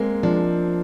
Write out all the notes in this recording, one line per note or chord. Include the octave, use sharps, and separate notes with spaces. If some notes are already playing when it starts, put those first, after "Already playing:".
Already playing: G#3 A#3 C4
F3 D4